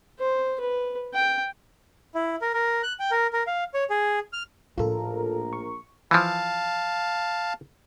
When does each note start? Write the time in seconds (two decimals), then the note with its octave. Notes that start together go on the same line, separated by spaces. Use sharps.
0.20 C5
0.60 B4
1.15 G5
2.15 E4
2.42 A#4
2.54 A#4
2.83 F#6
3.00 G5
3.11 A#4
3.33 A#4
3.47 F5
3.74 C#5
3.90 G#4
4.33 F6
4.78 A#1 A2 A3 F4 A4 A#4
5.53 C#6
6.11 E3 F3 F5 A5